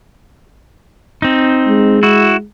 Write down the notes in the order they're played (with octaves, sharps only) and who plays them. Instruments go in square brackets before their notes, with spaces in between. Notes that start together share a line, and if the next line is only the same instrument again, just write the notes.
[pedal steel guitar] C4 D#4
[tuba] G#3
[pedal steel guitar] E4 F#4